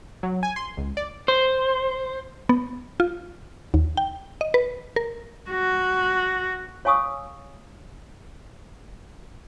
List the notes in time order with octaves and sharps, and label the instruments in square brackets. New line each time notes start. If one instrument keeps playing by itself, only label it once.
[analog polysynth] F#3
G#5
C6
C#2
D5
[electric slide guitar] C5
[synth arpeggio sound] B3
F4
D#2
G5
D#5
B4
A#4
[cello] F#4
[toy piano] C#5 F5 G#5 C#6 D#6 E6